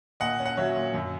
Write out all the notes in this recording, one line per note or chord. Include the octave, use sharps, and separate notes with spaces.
A#2 D#5 F#5
C#4
F#5
F#3 C#5 E5
A#2
F#2